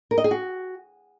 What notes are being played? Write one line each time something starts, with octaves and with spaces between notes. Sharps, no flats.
A#4
D#5
G#4
F#4